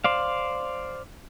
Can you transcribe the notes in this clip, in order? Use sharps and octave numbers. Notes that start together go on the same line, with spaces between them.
C5 D5 F5